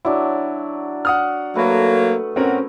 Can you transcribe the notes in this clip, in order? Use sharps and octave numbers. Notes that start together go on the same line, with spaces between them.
F#3 D4 E4
F#5 D#6 F6
F#3 A3 A#3 B4
A#2 C4 C#4 F#4 A#4